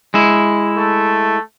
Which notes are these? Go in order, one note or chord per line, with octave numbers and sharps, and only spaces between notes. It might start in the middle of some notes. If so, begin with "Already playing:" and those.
G#3 E4
A3